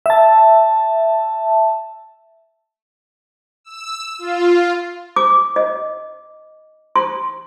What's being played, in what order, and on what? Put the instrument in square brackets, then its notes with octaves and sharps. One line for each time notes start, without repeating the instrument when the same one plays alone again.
[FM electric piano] E5 A5
[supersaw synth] E6
F4
[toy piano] D6
D#5
C6